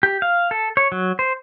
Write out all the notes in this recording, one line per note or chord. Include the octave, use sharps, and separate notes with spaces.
G4
F5
A4
C#5
F#3
C5